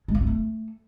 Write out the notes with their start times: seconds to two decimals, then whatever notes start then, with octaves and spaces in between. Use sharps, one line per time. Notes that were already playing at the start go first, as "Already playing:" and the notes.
0.08 G#3
0.15 B3
0.21 F4
0.27 A3